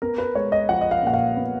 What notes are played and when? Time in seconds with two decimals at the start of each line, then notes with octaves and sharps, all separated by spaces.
0.02 B3 A#4
0.18 B4
0.35 G#3 C#5
0.52 D#5
0.69 F3 F#5
0.81 D#5
0.91 F5
1.03 A#2 F#5
1.14 F5
1.36 B3